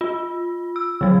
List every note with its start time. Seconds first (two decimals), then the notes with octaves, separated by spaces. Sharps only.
0.01 F4
0.76 E6
1.01 D3 F#3